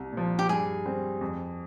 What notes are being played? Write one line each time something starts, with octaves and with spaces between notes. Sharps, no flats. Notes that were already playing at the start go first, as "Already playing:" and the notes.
Already playing: C2
A#2 F3
G4
G2 G#4
G3 C4
F2